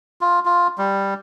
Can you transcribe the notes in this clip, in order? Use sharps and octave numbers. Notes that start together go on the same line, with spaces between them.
F4
F4
G3